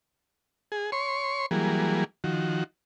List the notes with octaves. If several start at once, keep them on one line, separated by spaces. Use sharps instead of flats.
G#4
C#5 C6 C#6
E3 F#3 G3 A#3 G#4
D#3 F3 F#4